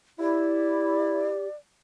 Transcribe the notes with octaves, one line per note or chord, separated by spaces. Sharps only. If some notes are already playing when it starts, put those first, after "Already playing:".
E4 G4 D5